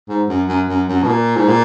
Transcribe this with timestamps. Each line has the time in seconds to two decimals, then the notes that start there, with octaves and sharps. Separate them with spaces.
0.08 G#2
0.29 F#2
0.48 F#2
0.68 F#2
0.88 F#2
1.03 B2
1.07 A#2
1.36 G#2
1.48 A#2